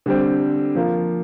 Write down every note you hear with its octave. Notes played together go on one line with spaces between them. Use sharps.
D3 G3 C4
F3 A#3 F4